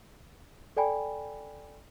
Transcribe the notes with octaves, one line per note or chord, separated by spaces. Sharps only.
A4 D5 G5 G#5 B5